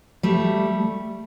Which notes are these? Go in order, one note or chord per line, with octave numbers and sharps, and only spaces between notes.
G3 A3